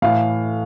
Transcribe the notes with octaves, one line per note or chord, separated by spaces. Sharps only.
A2 E3 F5